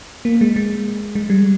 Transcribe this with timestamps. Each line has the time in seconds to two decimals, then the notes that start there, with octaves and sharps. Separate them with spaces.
0.25 A#3
0.41 G#3
0.56 G#3
1.15 G#3
1.30 G3